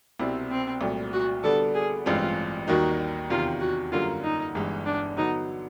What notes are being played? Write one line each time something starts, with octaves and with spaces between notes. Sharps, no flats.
C2 B2 G3 C4 E4
C4
C2 A#2 F#3 A3
F#4
D3 G3 B3 D4 A4
G#4
A1 G2 E3 G#3 C4 F4
D#2 D#3 G3 A#3 D#4 F#4
E2 C3 D#3 F4
F#4
F#2 D3 G3 A#3 F4
D#4
G1 G2 E3 G#3
D4
D3 F#3 B3 D#4